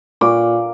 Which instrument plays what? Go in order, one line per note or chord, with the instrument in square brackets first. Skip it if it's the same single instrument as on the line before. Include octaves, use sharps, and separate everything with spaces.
[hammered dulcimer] A#2 D6